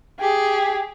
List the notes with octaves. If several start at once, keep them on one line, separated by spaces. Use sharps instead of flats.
G4 G#4